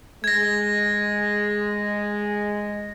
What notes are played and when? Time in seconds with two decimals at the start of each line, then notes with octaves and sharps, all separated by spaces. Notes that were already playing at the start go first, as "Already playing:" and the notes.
0.24 G#3 G#6 A#6